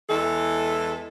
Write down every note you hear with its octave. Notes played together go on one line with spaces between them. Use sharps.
E2 E3 G#3 A4